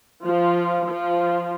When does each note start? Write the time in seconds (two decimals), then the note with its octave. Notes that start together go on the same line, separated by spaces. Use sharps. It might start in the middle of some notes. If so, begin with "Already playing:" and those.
0.25 F3 F4
0.88 F3 F4